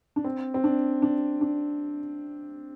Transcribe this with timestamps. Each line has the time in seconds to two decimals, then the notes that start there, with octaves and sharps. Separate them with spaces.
0.16 D4
0.24 C4
0.54 C4
0.64 D4
1.02 D4
1.41 D4